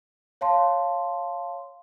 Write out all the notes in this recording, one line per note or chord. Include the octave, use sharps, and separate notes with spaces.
C#5 F5 A5 C6